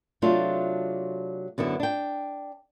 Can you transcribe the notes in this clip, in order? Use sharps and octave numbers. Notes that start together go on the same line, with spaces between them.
C3 F#3 A3 D4 F4
F#2 D3 B3 E4
D4 G5